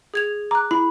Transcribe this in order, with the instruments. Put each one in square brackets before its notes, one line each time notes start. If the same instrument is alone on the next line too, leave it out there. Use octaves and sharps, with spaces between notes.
[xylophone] G#4 G#6 F7
[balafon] A#5 [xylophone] D6 F#6
[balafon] E4 [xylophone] B5